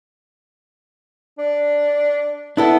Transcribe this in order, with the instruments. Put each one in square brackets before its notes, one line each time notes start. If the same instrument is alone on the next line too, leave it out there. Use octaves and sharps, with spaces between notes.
[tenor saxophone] D4
[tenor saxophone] B3 [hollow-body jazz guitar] D4 E4 A4